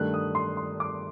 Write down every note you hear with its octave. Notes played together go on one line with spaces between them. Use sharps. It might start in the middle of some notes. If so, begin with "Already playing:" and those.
Already playing: G2 D#3 A3 F#6
D#6
C6
C6
D6